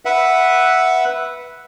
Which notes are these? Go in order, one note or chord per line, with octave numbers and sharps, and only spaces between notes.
B4 E5 F#5